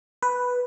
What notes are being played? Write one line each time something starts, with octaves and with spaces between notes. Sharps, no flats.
B4